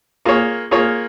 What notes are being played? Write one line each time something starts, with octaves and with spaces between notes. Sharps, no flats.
A#3 F4 G#4 C#5
A#3 F4 G#4 C#5